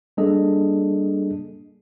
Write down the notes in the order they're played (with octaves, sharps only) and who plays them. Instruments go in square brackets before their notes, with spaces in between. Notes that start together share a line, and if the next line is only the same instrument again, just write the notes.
[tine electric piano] G3 A#3 D4 G#4 A4 D#5